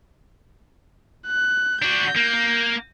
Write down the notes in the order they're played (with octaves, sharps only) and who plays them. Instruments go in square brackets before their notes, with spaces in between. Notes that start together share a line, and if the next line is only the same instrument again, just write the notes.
[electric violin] F#6
[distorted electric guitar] D4 F#4 [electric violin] G6
[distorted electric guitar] A#3